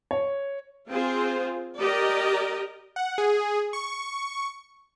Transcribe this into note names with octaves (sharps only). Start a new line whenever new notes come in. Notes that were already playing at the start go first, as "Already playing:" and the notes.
C#5
C4 F4 G#4 C5
G4 A#4 D5 D#5
F#5
G#4
C#6